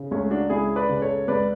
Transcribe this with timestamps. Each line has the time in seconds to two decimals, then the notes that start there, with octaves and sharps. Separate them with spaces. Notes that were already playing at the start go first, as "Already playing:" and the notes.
Already playing: C#3
0.11 C#2 A3 C#4
0.30 D4 F#4
0.50 C#2 E4 G#4
0.76 B4 D5
0.89 C#3
1.02 A4 C#5
1.28 C#2 B4 D5